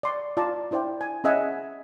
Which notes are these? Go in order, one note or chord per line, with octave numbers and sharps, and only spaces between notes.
D5 C6 C#6
F4 D5 A5 A#5
D4 E4 C5 D5 G5
G#5
C#4 G#4 D#5 E5 F#5 G#5